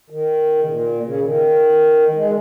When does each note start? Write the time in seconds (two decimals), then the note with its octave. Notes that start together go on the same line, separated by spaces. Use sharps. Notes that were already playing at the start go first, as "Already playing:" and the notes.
0.10 D#3
0.60 C#3
0.66 A#2
1.03 C#3
1.21 D#3
2.14 G#3
2.25 D#3